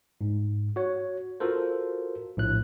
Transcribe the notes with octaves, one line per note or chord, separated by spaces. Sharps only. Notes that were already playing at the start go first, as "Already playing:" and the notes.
G#2
F#4 C#5
F4 F#4 A4 A#4 C5
A#1 A2 F#6